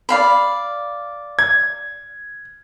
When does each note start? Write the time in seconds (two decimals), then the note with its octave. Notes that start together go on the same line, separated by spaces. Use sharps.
0.09 D5 F5 B5
1.39 G#6